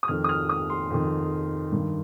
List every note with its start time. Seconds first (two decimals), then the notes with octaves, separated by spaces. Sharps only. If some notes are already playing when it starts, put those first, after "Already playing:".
0.03 D#6
0.08 F2 D#3 F6
0.24 D#6
0.29 F6
0.49 D#6
0.70 C6
0.90 F2 D#3
1.72 G2 D#3